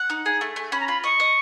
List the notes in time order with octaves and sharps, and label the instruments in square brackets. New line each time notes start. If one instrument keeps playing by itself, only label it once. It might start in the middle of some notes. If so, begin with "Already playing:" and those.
Already playing: [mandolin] F#5
D#4
G#4
A3
A3
[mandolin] C#4 [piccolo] B5
[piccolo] A#5
[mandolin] F4 [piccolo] B5
[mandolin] D#5 [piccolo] C#6
[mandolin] D#5